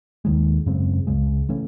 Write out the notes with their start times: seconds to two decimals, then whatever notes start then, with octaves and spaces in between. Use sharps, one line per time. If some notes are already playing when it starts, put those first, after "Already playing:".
0.25 D#2 D#3 G#3
0.66 F#2 C#3 G#3 C4
1.07 C#2 C#3 G#3
1.49 E3 A3 C#4